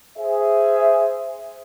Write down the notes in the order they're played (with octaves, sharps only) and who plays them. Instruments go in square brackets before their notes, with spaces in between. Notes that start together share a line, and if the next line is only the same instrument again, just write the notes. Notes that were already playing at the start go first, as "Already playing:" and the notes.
[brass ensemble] G#4 C5 E5